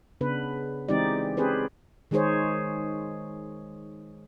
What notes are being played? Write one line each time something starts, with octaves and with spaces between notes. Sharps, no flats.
C#3 B3 D4 B4
E3 G#3 C4 D#4 G4 D5
C4 C#4 G4 G#4 B4 C5
D#3 G#3 D#4 G#4 C5 C#5